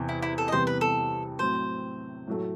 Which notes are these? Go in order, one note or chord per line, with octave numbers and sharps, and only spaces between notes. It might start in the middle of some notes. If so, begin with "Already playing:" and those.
Already playing: E2 C3 E3
E4
E4
A4
D#5
E2 C3 E3 G3 B3 C5
B4
A4
A2 F#3 C4 C5
A2 F#3 A3